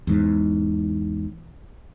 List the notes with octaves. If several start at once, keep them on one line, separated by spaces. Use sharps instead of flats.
E2 G#2